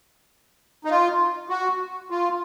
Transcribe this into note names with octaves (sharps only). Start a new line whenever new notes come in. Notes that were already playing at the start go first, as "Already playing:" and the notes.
D#4
F4
F#4
F4